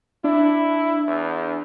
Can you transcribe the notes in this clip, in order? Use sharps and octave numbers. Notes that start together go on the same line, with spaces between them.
D4 E4
E2